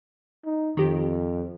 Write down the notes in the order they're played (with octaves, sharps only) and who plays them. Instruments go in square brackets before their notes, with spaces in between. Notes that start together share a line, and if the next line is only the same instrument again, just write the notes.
[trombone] D#4
[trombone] F2 [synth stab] D#3 G4